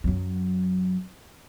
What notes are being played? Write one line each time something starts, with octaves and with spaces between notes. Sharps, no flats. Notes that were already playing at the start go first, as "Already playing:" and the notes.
F#2 F#3